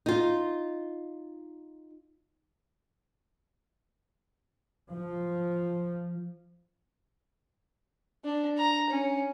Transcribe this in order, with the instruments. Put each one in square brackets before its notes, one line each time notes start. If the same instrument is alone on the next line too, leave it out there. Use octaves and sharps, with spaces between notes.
[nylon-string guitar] D#4 F4
[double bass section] F3
[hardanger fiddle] D4
A#5
C#4